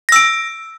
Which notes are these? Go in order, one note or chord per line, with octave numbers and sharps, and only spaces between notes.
E6 A#6 D7